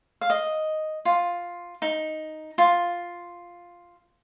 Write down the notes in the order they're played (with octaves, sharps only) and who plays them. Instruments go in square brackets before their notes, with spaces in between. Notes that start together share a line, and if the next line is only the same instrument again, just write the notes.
[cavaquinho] F5
D#5
F4
D#4
F4